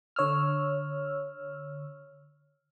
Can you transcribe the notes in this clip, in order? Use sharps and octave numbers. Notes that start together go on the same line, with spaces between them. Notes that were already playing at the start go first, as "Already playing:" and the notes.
D3 C#5 E6 F6